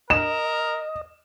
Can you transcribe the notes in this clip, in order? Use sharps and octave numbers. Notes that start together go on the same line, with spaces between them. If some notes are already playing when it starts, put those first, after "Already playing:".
A#4 D#5 E7